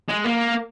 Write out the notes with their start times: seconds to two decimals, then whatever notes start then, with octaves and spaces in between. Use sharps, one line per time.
0.09 G#3
0.25 A#3